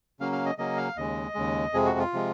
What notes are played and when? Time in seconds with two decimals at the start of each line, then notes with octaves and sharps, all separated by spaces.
0.20 C#3 F#3 A#3 C#4 F5
0.32 F5
0.46 D#5
0.58 C#3 F#3 A#3 C#4 D#5
0.77 F5
0.97 D#2 C#3 G#3 D#5
1.35 D#2 C#3 G#3
1.74 F2 C3 F3 G#3 G#4
1.86 F#4
1.99 F4
2.13 C3 F3 G#3